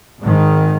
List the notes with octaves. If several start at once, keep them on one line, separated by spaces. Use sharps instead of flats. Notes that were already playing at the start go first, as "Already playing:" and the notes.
G#1 G#2 D#3